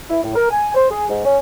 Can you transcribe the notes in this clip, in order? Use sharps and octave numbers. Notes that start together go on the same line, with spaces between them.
E4
A2
A#4
G#5
C5
G#4
G#2
C#4